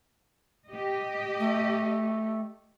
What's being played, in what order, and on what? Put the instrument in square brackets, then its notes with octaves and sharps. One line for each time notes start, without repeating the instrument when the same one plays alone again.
[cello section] G4 D#5
[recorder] A3